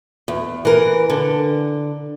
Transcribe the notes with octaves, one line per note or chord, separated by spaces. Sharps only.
E2
E3 A#4
D3